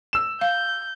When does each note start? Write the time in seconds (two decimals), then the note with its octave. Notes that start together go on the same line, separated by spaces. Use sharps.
0.13 E6 E7
0.41 F5 G6